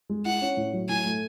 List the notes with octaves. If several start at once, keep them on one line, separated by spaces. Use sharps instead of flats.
G#3
E4 F#5
C#4
A2
F#3
A2 G#5
A3